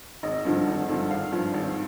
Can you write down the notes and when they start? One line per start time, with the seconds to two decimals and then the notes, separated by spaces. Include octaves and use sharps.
0.23 G#1 D#5
0.45 G2 D3 F3
0.67 G#1
0.89 G2 D3 F3
1.10 G#1 F5
1.32 G2 F3
1.54 G#1